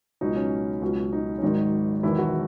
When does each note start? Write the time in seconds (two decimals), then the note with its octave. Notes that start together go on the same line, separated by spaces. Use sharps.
0.21 C#2 B2 F#3 D#4
0.36 C#4
0.81 C#2 B2 F#3
1.12 D#4
1.38 C#4
1.42 G#1 G#2 D#3 F#3 D#4
2.03 E1 E2 D#3 F#3 E4
2.18 F#4